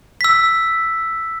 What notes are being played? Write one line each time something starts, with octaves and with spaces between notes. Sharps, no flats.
E6 B6